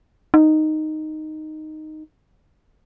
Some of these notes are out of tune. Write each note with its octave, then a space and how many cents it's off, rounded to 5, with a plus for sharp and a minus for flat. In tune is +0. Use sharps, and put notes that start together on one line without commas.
D#4 -5